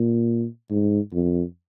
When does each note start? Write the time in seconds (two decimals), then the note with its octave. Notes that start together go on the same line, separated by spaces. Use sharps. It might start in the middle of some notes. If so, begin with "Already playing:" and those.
Already playing: A#2
0.71 G#2
1.13 F2